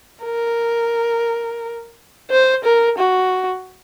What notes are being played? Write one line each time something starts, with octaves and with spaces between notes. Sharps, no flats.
A#4
C5
A#4
F#4